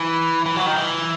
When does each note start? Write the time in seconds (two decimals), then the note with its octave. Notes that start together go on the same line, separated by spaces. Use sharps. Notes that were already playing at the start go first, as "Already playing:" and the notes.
Already playing: E3
0.46 E3
0.56 F#3
0.66 D#3
0.76 E3